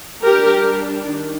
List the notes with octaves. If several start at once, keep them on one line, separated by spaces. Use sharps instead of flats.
G3 D4 G4 A#4
D#3